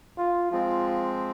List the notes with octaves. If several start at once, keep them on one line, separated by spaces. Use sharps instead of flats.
F4
F3 G#3 C4 F4